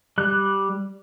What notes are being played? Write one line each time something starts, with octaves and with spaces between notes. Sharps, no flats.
G3 F#6